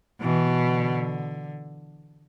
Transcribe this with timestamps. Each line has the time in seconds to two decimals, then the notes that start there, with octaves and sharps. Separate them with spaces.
0.21 B2 E3
0.62 D3